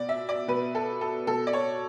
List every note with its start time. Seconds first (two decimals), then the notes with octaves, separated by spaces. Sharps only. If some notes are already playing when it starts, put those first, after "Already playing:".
Already playing: B2 D5
0.09 E5
0.29 D5
0.48 B2 B4
0.75 A4
1.01 A4
1.27 B2 A4
1.47 D5
1.53 C#5